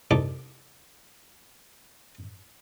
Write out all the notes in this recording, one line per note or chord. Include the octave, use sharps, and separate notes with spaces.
C2 D#4 A4 D6